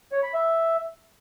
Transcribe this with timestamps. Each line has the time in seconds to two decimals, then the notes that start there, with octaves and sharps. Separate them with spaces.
0.12 C#5
0.23 B5
0.34 E5